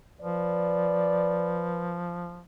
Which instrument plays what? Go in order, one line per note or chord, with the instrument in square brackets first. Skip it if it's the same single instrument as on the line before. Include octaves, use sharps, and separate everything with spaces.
[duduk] F3 [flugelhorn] B4 [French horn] D5